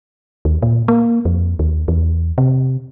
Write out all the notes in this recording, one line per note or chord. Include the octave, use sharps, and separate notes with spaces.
D#2
A#2
A#3
F2
D#2
E2
C3